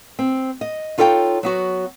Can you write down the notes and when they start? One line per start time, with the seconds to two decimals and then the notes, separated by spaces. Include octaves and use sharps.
0.19 C4
0.61 D#5
0.98 D#4 F4 A4 C#5 E5 G5
1.43 F#3 B3 F#4